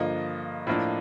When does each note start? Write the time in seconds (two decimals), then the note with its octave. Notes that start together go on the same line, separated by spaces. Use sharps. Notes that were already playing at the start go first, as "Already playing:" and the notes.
Already playing: G2 D3 F3 A#3 D#5
0.67 A2 F3 A#3 D4